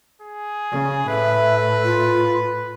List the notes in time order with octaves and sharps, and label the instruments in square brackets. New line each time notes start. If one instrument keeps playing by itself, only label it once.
[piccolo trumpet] G#4
[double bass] C#3
[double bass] A2 [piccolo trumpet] B4 [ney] E5
[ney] F4